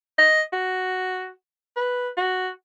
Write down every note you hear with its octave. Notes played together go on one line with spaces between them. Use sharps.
D#5
F#4
B4
F#4